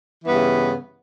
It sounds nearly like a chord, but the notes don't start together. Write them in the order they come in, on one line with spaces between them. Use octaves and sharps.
E3 B3 G2 C#3